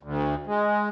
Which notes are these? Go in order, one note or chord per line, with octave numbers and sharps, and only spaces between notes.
D2
G#3